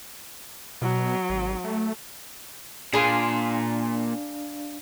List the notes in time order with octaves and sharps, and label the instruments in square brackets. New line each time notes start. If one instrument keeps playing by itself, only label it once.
[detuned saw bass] B2 [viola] F#3
[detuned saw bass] G#1
A3
[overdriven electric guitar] A#2 [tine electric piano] D4 D5 F5 [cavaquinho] G#4 C6